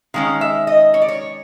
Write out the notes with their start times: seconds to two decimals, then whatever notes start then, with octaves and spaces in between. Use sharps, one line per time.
0.14 D#3 G#3 C#4 F5
0.41 E5
0.67 D#5
0.94 C#5
1.02 D5
1.08 C#5